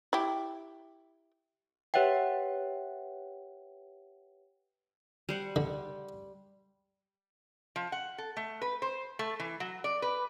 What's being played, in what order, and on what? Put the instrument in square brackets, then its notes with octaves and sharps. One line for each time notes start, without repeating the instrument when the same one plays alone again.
[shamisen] E4 G4
[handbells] G4 B4 C#5 E5 F#5 G5
[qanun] G3 C5 F#5
[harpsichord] D3
[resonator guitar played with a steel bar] F3
F#5
A4
A3
B4
C5
A3
E3
F#3
D5
B4